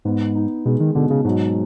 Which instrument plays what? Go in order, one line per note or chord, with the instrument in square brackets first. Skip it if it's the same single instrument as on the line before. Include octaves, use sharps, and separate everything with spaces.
[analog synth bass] G#2 [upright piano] B3
[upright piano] D#4
[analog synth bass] B2 [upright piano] G#3
[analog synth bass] D#3
[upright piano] B2 [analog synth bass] D3
[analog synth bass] C#3
[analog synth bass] G#2 [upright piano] F#3